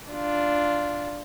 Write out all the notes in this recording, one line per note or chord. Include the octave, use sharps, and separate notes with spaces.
D4 F4